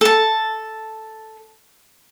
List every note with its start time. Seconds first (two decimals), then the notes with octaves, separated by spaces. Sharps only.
0.01 A4 A5